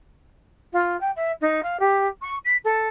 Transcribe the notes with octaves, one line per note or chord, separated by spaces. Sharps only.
F4
G5
E5
D#4
F5
G4
C#6
B6
A4